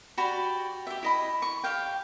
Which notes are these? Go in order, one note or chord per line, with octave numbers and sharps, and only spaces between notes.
F#4 G4 D5 B5
G4 E5
E4 D#5 B5
C#6
G4 F5 G5